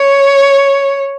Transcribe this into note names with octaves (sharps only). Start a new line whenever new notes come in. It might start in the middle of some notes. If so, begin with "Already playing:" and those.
Already playing: C#5